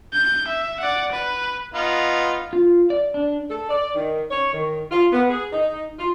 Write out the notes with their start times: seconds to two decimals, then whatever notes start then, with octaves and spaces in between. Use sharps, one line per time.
0.13 G6
0.48 E5
0.80 D5 F#5
1.11 B4
1.74 B3 D#4 F4
2.53 F4
2.90 D5
3.14 D4
3.50 A4
3.69 D5
3.95 D#3
4.31 C#5
4.52 D#3
4.91 F4
5.11 B3
5.30 G#4
5.52 D#4
5.98 F4